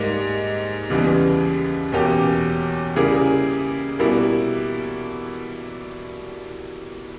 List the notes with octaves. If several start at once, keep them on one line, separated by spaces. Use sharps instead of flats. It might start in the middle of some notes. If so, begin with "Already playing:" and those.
Already playing: G#2 G3 A#3
D#2 C#3 E3 G3 B3
E2 B2 A#3 C#4 G4
C#3 G3 A#3 E4 G#4
B2 G3 A#3 E4